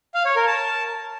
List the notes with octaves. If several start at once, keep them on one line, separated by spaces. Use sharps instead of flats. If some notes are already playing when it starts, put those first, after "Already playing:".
F5
C#5
A#4
A5